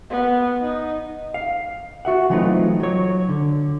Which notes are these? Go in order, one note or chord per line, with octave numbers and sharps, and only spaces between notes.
B3
D#4
F5
F#4 E5 F#5
E3 F#3 A3 C4 D#4 F4
F#3 C#5
D3